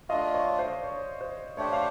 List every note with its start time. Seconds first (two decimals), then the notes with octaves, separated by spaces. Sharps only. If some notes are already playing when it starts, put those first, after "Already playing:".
0.09 A3 D4 F4 D#5 F5
0.34 C#5 D#5
0.59 C5 D5
0.83 C#5
1.21 C5
1.57 A3 D4 G4 C5 C#5
1.73 F5